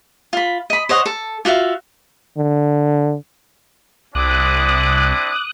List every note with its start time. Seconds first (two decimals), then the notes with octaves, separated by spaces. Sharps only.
0.33 F4 B5
0.70 D#5 B5
0.89 C5 C#5 D#5 F#5
1.06 A4
1.45 F4 F#4 E5 F5
2.37 D3
4.15 C2 C4 D4 E4 D6 D#6 F#6